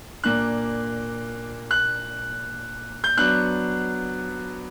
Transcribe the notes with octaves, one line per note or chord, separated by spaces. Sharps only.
A#2 A#3 D4 F#6
F#6
G6
F#3 B3 D4 F#6